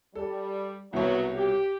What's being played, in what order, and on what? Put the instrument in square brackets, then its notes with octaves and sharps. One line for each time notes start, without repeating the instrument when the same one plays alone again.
[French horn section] G3 [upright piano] A4
[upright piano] C2 B2 C#5 [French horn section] F#3 B3
[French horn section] G4